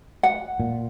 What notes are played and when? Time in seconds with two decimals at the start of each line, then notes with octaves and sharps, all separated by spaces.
0.23 F#5
0.60 A#2